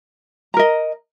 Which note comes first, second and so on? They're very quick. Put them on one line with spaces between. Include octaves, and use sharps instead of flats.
A#5 A#4 D#5